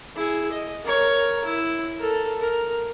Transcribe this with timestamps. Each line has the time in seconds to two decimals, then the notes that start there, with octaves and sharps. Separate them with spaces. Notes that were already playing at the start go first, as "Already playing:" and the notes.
0.16 E4 G#4
0.52 D#5
0.84 A#4 C#5
1.44 E4
1.98 A4 A#4
2.41 A#4